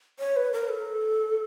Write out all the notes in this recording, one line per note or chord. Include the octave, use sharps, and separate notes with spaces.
C#5
B4
A#4
A4